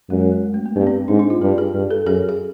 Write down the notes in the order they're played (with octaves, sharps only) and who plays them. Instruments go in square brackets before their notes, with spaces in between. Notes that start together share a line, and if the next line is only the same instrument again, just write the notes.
[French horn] F#2 [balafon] G#3
[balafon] G#3
G#3
G#3
A3
A#3
[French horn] G2 [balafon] B3
[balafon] C4
[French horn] G#2 [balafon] D4
[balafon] D4
F4
[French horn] G2 [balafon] G4
[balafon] G#4
[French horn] G2
[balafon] A4
[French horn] F#2 [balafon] G#4
[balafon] G#4